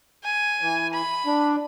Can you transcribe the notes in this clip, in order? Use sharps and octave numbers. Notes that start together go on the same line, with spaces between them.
G#5
E3
B5
D4